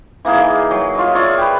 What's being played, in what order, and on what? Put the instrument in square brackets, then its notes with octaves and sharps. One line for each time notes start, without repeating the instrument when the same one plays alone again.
[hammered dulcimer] E3 A#3 D#4 G#4
F#3
F4 C#5 D#5
F4 C#5 D5 E5
G4 B4